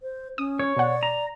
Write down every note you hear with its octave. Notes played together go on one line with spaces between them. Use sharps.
C5
C#4 D#6
C#5
B2 D5 F#5
A#5